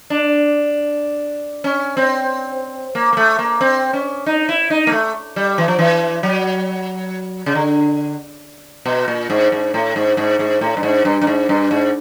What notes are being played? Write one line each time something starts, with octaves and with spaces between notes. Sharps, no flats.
D4
C#4
C4
A#3
A#3
A3
A#3
C4
C#4
D#4
E4
D#4
A#3
A3
G3
E3
F3
E3
F#3
C#3
D3
B2
A#2
G#2
G#2
A2
G#2
G#2
G#2
A2
G2
G#2
G2
G2
G#2
G2
G#2